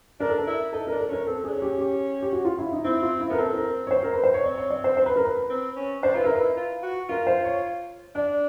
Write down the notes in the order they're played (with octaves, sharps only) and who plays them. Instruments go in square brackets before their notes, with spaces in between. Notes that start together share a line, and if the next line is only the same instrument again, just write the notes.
[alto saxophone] D4 [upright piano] A#4
[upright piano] A4
A#4
[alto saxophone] E4
[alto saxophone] D#4 [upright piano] A4
[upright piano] A#4
[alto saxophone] D4
[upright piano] A4
[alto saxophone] C#4 [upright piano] A#4
[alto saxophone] C4 [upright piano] A4
[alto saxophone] D4 [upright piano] G#4
[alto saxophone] C#4
[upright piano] G4
G4
G4
F#4
F4
E4
D#4
[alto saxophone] C4 [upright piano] E4
[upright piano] F4
E4
[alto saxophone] B3 [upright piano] A#4
[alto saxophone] C4 [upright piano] A4
[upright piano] A#4
C#5
C5
A#4
B4
C5
C#5
[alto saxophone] C4 [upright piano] D5
[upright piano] C#5
D5
C5
C5
B4
A#4
B4
[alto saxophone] C4
C#4
[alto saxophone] D4 [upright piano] C5
[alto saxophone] F4 [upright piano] B4
[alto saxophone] E4 [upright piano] A#4
[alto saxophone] D#4
[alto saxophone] E4 [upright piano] B4
[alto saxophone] F4
F#4
[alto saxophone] F4 [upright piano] A#4
[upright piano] C5
C#5
[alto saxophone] D4 [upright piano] D5